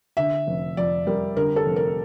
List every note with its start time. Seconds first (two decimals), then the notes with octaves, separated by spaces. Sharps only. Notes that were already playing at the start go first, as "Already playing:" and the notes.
0.17 D3 E5
0.47 F1
0.77 F2 D5
1.07 G3 A#4
1.36 D3 A#4
1.56 A4
1.66 F1
1.76 A#4